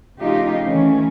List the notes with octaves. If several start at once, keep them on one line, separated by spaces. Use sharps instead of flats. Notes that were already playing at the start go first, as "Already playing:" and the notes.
C#3 F3 A3 D#4 F4 G4
D#3 E3 A3 C#4